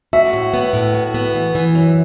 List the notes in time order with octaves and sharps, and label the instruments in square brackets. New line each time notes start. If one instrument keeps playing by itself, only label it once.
[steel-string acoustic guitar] F#4 [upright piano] E5
[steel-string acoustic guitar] A2
B3
A2
F#4
B3
E3
E3
F#2